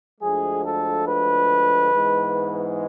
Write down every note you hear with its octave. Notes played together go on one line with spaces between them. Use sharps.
D2 D3 F3 G#3 G#4
A4
B4
G#2 E3 G#3 B3